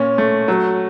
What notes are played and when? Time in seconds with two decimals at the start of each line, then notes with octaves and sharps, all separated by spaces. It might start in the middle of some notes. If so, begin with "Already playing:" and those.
Already playing: A#2 C#4
0.18 A3
0.48 F#3